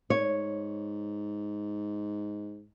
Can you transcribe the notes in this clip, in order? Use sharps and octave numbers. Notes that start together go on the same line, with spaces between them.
G#2 C#5